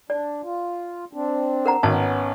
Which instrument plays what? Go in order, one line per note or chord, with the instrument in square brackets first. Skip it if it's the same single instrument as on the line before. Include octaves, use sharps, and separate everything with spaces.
[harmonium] D4 [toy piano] D5
[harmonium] F4
C4 D4
[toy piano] A#4 F#5 A#5
[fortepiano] G#1 [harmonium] B3 C#4 [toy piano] A5